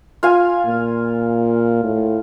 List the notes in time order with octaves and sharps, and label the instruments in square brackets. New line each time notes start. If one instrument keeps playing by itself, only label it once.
[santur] F4 F5 G#5
[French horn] A#2
A2